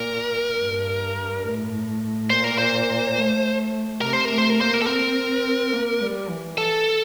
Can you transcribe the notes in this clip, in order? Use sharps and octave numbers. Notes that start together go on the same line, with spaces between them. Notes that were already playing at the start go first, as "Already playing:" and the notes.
Already playing: A#2 A#4
G2
A2
A#2 C5
A#4
C5
A3
C3 A#4
C5
A3 A#4
C5
A#4
A#3 C5
A#4
A4
C4 A#4
A#3
G3
E3
A4